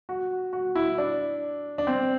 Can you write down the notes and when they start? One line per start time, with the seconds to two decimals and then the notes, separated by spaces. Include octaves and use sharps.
0.09 F#4
0.53 F#4
0.76 E4
0.98 D4
1.78 D4
1.87 C4